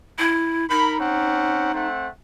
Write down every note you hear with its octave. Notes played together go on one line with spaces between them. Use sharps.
E4
D#4 A#4 B5
C4 C#4 F#5
A3 C4 F#5